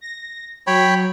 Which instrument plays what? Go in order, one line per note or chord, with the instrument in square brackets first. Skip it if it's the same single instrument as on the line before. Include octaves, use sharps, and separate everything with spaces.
[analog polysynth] A#6
[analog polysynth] F#3 [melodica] C#5 G5 B5